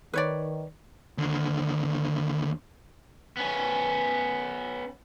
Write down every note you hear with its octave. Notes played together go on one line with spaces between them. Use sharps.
D#3 B4 C#5 D5
D#2 D3
B3 C#4